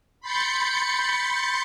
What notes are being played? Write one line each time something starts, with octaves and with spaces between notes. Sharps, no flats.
B5 C6 G6 A6 C#7